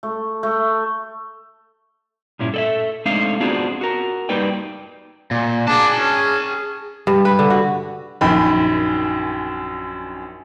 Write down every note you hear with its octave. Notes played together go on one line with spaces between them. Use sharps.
A3
A3
G2 A#2 C#4 E4
A4 D5 E5
G#3 A3 C4 D4 D#4 F5
B3 C4 D4 F4 F#4 G#4
F#4 A#4
G3 A#3 D#4 B4 D5 G5
A#2
D4 G#4 A5
C#4
G2
B4
D3
F#4
A#1 F#2 D#3 G5 B5